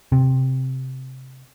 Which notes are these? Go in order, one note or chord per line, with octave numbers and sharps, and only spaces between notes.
C3